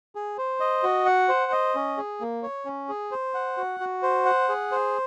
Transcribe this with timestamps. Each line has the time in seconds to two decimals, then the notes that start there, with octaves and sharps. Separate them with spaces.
0.15 G#4
0.38 C5
0.60 D#5
0.83 F#4
1.05 F#5
1.28 C5
1.52 D#5
1.75 C#4
1.97 G#4
2.21 A#3
2.43 C#5
2.65 C#4
2.89 G#4
3.11 C5
3.34 F#5
3.57 F#4
3.80 F#4
4.03 C5
4.25 F#5
4.49 G#4
4.72 C5